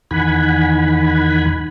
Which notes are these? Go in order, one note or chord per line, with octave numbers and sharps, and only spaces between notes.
E2 D#3 F#5 G#5 B5